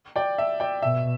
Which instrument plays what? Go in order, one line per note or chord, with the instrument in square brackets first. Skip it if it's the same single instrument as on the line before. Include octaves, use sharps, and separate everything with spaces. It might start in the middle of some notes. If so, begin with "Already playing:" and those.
[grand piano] D5 G5
E5
D5 G5
[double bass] B2 [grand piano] E5